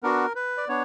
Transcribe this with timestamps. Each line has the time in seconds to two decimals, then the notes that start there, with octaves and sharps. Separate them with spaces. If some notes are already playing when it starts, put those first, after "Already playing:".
0.03 B3 D4 F#4 A#4
0.35 B4
0.57 D5
0.68 B3 D4 C#5